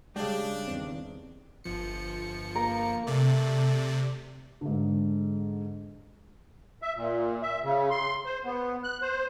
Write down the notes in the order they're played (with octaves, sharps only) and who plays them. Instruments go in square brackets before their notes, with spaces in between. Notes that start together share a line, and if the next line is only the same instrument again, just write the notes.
[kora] C#3 G4 [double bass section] G3 [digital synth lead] G#3 [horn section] D4
[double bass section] E2 D#3 [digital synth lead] C4
[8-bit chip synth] G1 F3 C#7
[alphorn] A#3 [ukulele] A#4
[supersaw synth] C3 [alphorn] A3 [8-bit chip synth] D5
[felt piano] G#2 D3
[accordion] E5
A#2
E5
C#3
C6
C5
B3
F#6
C5